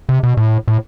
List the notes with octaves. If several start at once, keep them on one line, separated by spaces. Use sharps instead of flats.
C3
B2
A2
A2